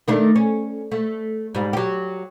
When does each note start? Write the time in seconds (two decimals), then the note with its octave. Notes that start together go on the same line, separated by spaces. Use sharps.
0.08 D#3 A3 D4
0.36 C#4
0.91 A3
1.55 G#2 G3
1.73 F#3 G4